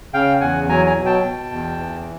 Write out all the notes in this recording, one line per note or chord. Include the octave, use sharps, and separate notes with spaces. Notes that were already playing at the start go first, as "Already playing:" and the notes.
C#3 F5 G5
E2 F#5 G#5
F#3 G#5 A#5
G#5 A#5
B2
G5 A5
B2
E2
E3